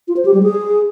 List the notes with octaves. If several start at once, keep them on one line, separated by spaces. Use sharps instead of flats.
F4
C5
G4
G3
G#4